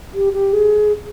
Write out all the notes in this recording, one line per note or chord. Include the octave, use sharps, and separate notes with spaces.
G4
G4
G#4